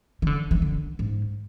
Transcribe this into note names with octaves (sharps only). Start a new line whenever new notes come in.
E3
D3
E3
D3
G#2